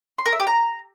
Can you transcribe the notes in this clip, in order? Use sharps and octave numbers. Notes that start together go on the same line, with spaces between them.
C6
A#4
E5
G4
A#5